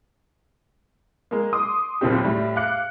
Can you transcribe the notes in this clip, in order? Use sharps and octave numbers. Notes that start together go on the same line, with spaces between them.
G#3 A#3
C6 D6 D#6
F#1 D#2 A#2 C4 G4
A2 G3
F5 D6 F#6 C#7